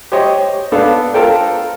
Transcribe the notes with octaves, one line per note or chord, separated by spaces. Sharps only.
G4 C5 C#5 D#5
B3 D4 A4 F5
F4 A4 A#4 C5 G5